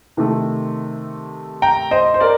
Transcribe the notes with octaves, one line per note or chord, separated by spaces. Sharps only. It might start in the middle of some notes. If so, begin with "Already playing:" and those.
C3 D#3 A3
G5 A#5
C5 D#5
C5
A#4 D5